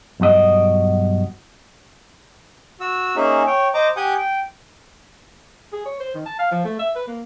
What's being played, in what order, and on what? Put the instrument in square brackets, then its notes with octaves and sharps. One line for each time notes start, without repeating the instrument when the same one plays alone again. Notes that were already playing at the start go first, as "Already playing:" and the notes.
[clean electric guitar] B1 G2 F#4 D#5
[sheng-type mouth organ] F#4 E6
A#3 C#4 D#4 G#4 E5
C#5 G5
C5 D#5 A#5 D6
G4 F#5 G#5 D#6 G6
G5
[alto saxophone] G#4
C#5
C5
D#3
A5
F5
F3
A3
E5
B4
A#3